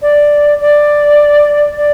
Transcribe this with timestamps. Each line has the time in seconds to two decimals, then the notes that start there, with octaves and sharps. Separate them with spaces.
0.02 D5
0.61 D5
1.77 D5